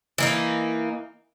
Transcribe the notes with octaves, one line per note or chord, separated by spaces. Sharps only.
E3 A#3 D#4